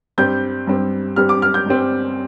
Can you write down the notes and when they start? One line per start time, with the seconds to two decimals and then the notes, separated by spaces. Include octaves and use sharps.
0.18 G2 G3 C4 G6
0.67 G2 G3 C4
1.16 G2 G3 C4 F6
1.29 D6
1.42 F6
1.54 G6
1.66 G2 G3 C4